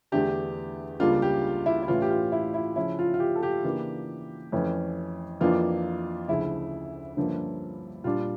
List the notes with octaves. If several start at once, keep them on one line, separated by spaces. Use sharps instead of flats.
E2 D3 A3 D4 G4
C#2 C#3 G3 A#3 D4 F4
G4
E4
E4
A2 E3 A3 C#4 F4
G4
F4
E4
E4
C#3 F3 C#4 E4
F4
F4
G4
A4
G4
C#3 E3 A#3 D4
F2 E3 A3 C#4
F2 E3 A#3 D4 F4
D2 C#3 F3 E4
G2 D3 F3 A#3 C#4
A#2 G3 D4 F4